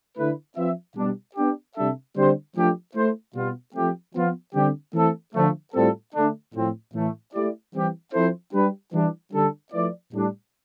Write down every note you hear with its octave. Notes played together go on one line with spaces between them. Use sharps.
D3 A3 E4 B4
F3 C4 F4 B4 E5
B2 G3 D4
B3 D4 G4
C3 G3 D4 A4 E5
D3 G3 C4 G4 C5
F3 A3 D4 G4
A3 E4 A4 C5
B2 G3 B3 F4
F3 A3 C4 G4
F3 B3 F4
D3 G3 C4 G4
E3 A3 C4 E4 A4
D3 F3 A3
A2 G3 C4 F4 A4
D3 A3 D4
A2 F3 C4
A2 E3 A3
A3 E4 G4 D5
E3 G3 C4 G4
F3 C4 E4 A4 C5
G3 D4 G4 B4
E3 G3 D4
D3 G3 D4 A4
F3 A3 E4 B4 D5
A2 G3 D4